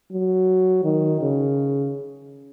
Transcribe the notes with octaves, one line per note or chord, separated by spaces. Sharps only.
F#3
D#3
C#3